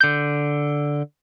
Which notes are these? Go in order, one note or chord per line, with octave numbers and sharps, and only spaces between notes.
D3 G6